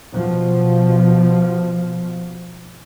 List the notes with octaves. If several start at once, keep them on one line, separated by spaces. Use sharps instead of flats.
B2 F3